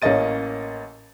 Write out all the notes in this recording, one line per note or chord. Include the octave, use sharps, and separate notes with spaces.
A1 A#3 C#4 D#5 A6 D#7